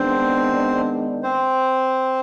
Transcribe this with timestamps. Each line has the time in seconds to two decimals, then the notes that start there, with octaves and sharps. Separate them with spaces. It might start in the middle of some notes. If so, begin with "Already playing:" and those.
Already playing: D#3 G#3 B3 C4 D4 C5
1.23 C4 C5